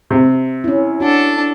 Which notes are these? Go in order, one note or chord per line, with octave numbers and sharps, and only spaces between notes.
C3
C#4 E4
D4 F#4 A4